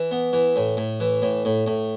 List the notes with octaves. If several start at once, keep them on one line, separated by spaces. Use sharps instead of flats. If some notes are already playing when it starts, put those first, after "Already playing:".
Already playing: E3
B3
E3
A2
A2
E3
A2
A2
A2